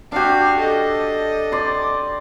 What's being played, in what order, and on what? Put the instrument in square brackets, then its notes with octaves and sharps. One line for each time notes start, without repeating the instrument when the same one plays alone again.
[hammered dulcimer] D4 G4 [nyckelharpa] F#4 F5
[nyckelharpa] A4 D#5
[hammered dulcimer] D5 C6